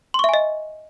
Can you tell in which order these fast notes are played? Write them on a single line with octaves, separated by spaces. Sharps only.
C6 C#6 E5 G#5 D#5